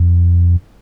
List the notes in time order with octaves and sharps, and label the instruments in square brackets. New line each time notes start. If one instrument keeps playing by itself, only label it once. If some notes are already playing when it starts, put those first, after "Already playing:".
Already playing: [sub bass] F2